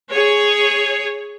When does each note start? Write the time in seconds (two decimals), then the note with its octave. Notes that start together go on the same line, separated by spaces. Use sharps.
0.12 G#4 C#5